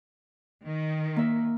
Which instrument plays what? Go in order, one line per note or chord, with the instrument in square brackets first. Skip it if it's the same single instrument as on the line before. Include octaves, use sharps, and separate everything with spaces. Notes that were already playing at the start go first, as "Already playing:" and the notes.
[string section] D#3
[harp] A#3 E5